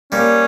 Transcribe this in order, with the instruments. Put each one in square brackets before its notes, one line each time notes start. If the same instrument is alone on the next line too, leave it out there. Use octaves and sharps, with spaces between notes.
[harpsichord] G3 A#3 [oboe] C#4